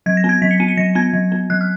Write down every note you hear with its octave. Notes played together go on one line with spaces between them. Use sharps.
F#3 G#6
A#6
B3
G#6
F#3 B6
C#7
B3 D#7
C#7
F#3 A#6
B3 G#6
F#3
B3
F#3 F#6
F6